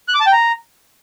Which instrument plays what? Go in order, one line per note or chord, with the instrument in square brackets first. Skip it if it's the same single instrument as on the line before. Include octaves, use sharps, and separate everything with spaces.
[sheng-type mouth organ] F#6
D6
A5
G5
A#5